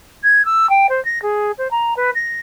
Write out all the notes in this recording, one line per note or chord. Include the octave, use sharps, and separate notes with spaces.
G#6
E6
G5
C5
A#6
G#4
C5
A#5
B4
A#6